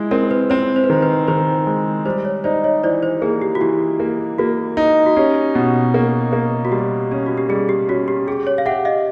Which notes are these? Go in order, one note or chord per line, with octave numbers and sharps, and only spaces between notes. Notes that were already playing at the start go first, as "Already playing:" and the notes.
Already playing: G#3 E4
C4 A#4
B4
C4 C5
C5
B4
D#3 C5
B4
D#3 C5
G#3
G3 C5
C#5
D#4 C5 D5
C#5 D#5
E3 C5 D5
C5
A#3 G#4
G4
F#4
E3 G4
A#3
A#3 F#4
D#4
F#4
C#4 G4
B2
A#3
A#3
F#4
G3 G4
C#4
F#4
G4
G3 G#4
G4
C#4 F#4
G4
G4 G#4
C#5
F5
G4 E5 F#5
D#5 F5